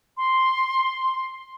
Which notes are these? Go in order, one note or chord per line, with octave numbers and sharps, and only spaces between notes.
C6